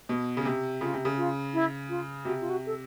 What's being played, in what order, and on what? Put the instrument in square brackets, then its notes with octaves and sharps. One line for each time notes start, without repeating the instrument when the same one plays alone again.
[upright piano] B2
C#3
C3
[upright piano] C#3 [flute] F4
[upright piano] C3
C#3
[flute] F4
E4
F4
[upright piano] C3 [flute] F#4
[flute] F4
F#4
A4